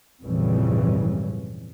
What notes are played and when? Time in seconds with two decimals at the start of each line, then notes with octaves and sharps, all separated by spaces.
0.23 G#1 F2 A#2 C#3 E3 G3